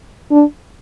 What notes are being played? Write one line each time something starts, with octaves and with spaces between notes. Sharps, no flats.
D4